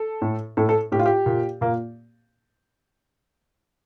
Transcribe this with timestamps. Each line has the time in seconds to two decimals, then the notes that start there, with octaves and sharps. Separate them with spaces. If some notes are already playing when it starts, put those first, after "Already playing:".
Already playing: A4
0.22 A2
0.57 A2 A4
0.69 A4
0.92 A2 G4
0.99 F4
1.06 G4
1.26 A#2
1.61 A#2 A#3